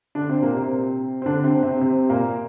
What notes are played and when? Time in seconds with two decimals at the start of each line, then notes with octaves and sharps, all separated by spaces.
0.15 D3 D4
0.29 C3 C4
0.42 A#2 A#3
0.56 C3 C4
1.22 C4
1.26 D3 D4
1.44 C3 C4
1.63 C3 C4
1.81 C3 C4
2.10 A#2 A#3